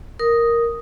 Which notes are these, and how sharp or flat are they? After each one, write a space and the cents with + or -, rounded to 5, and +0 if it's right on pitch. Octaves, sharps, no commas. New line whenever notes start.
A#4 +0 D#6 +0